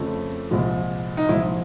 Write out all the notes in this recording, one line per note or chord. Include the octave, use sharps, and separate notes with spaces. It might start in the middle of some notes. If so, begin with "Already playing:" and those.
Already playing: F2 C#3 F3 A3
C2 A#2 F3 G#3
D#4
C2 A#2 F3 G#3 E4